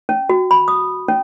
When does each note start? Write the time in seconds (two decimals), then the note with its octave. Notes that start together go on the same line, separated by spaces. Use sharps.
0.09 C#4
0.29 F#4
0.51 B5
0.68 D#6
1.08 C#4